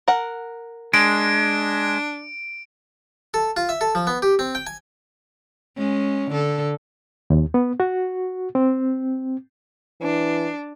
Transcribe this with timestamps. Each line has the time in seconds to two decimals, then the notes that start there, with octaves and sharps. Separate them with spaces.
0.08 A#4 F#5
0.94 G#3 D4 D7
3.34 A4
3.57 F4
3.69 E5
3.81 A4
3.95 F3
4.07 B3
4.22 G4
4.39 C4
4.55 G5
4.67 G#5
5.77 G#3 C#4
6.31 D3 A4
7.30 D#2
7.54 B3
7.80 F#4
8.55 C4
10.02 E3 D4